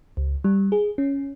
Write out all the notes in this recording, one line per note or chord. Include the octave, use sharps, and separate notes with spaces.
C#2
G3
G#4
C#4